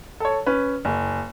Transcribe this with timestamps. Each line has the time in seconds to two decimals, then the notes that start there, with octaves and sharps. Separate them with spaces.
0.20 A4 C#5
0.46 C#4 B4
0.85 F#1